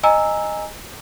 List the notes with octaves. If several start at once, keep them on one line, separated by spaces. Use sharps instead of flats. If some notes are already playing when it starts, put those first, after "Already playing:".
D#5 G#5 A#5 E6